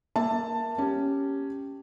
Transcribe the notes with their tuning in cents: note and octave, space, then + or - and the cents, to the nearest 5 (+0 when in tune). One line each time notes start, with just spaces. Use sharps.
A#3 +0 E5 +0 A5 +10
C#4 +0 G4 +0